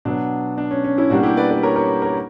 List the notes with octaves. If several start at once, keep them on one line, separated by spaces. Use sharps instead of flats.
B2 F#3 B3 D4
D4
C#4
C#4
C#4 E4
B2 G3 A#3 D4 F#4
E4 G4
B4 D5
B4 D5
A#4 C#5
A#4 C#5
A#4 C#5